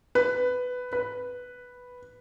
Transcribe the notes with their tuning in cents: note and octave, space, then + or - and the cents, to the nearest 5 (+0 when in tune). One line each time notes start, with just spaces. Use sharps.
B4 +10
B4 +0